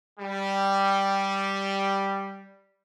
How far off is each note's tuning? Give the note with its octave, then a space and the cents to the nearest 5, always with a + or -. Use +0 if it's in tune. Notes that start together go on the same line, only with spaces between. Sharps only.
G3 +0